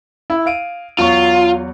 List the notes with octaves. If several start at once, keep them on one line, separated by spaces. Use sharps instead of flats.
E4
F5 D7 D#7
E2 F#3 F4 C#6